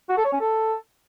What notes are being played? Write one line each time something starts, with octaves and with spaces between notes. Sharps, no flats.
F#4
A4
C#5
C#4
A4